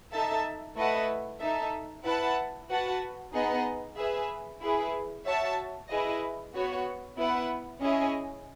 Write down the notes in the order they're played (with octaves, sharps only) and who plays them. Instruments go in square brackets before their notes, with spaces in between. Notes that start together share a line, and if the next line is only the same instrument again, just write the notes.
[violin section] D#4 A4 E5 A5
A3 E4 B4 D#5 F#5
D#4 A4 E5
E4 B4 F#5 A5
F#4 B4 F#5 A5
B3 D#4 G#4 D#5 F#5
G#4 B4 E5
E4 G#4 B4
F#4 C#5 E5 A5
E4 G#4 B4 D#5
B3 F#4 C#5
B3 E4 B4 F#5
C#4 E4 G#4 D#5